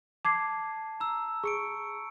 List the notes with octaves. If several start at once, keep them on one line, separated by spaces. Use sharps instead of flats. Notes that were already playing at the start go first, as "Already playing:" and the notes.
A5 D6 G#6 C7
A#5 E6
G#4 C#6 C#7 D7